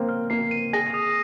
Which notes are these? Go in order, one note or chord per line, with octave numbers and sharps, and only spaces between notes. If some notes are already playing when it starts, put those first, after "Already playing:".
Already playing: A#3 C4
F6
A#3 C7
D#7
G#4 A#6
D#6